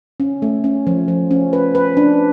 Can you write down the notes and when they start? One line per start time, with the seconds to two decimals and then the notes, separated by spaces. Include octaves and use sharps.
0.20 C#4
0.42 A3
0.64 C#4
0.87 F3
1.08 F3
1.31 C#4
1.53 B4
1.75 B4
1.97 D4